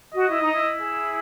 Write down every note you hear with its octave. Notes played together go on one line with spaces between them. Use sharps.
F#4 D#5
E4
D#4
E4
G#4